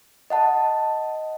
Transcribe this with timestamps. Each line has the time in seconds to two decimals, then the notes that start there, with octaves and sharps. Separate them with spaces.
0.30 D#5 F#5 A5